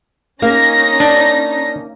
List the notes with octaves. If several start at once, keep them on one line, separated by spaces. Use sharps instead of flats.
A#3 C#4 D#4 F5 A#6
D4